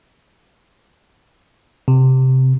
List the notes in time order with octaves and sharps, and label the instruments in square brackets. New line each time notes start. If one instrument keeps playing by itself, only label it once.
[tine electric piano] C3